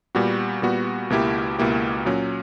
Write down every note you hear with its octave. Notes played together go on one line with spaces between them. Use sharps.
A#2 G3 B3 F#4
A#2 G3 B3 F#4
C#2 B2 A#3 E4 G4
C#2 B2 A#3 E4 G4
A#2 F#3 C#4